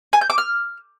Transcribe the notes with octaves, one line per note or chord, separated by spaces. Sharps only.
G#5
G6
D6
F6